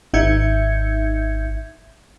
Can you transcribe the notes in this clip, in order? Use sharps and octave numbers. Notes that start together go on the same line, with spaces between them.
G#1 D#4 E5 G6 G#6 C#7